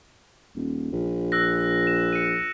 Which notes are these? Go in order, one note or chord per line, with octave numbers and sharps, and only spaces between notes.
D#1
A#1
E6 F#6 A#6
E7
C#7 D#7